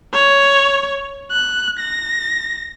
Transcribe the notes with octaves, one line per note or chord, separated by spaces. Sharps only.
C#5
F#6
A#6